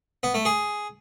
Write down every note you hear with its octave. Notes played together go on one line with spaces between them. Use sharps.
B3
A3
G#4